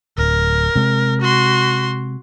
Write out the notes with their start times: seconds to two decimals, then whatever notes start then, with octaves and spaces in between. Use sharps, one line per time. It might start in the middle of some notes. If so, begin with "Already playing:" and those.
0.18 D1 A#4
0.75 C3 G#3
1.22 F#4 C6